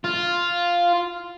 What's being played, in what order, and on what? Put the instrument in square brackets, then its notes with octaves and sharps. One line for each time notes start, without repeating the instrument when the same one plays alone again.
[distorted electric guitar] F4